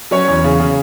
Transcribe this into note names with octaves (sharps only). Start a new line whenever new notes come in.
F#3 C#4 C#5
E2
C#3
C#3